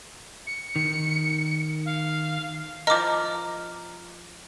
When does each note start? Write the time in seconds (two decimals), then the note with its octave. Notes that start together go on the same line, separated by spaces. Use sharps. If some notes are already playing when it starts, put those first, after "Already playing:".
0.47 C#7
0.76 D#3
1.86 F5
2.87 F3 A#4 D#5 D6